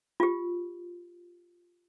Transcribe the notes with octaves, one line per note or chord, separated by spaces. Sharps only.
F4 G4